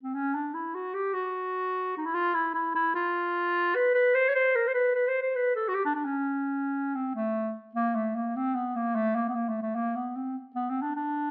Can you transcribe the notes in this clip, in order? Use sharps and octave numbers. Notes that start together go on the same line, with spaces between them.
C4
C#4
D4
E4
F#4
G4
F#4
D#4
E4
F4
E4
E4
E4
F4
B4
B4
C5
C#5
C5
A#4
C5
B4
B4
C5
C5
B4
A4
F#4
G4
D4
D4
C#4
C4
A3
A#3
A3
A#3
C4
B3
A#3
A3
A#3
B3
A#3
A3
A3
A#3
B3
C4
B3
C4
D4
D4